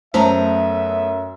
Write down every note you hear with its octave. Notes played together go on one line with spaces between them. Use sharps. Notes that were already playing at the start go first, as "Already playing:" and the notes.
F#2 A3 B3 C5 E5 A#5